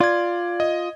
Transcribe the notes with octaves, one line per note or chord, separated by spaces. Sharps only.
F4 D5 G#6
D#5